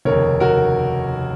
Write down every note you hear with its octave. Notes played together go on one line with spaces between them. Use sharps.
F1 D#2 C#3 A#4 C#5
F#4 A#4